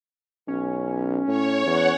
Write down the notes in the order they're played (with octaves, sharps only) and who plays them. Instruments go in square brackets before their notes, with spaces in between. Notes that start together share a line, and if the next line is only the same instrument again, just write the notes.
[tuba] B1 [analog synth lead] C#4
[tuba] A2 [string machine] C#5
[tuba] E2 [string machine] C#5 F#5